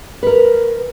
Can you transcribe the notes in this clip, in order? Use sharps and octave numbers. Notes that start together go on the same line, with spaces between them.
A#4 B4